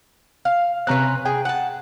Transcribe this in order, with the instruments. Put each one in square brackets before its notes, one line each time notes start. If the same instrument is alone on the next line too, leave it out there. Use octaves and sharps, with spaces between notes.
[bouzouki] F5
[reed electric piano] C3 A#5 F#6 [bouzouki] C4 C#4 B4
[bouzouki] G#4 [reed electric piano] G5
[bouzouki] F#5 A5